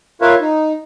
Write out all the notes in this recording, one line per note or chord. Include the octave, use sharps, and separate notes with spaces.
F4 A#4 B4 C#5 E5 F5
D#4